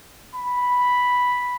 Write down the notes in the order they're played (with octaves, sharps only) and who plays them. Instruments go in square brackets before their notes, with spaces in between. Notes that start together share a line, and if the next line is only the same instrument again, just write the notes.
[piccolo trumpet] B5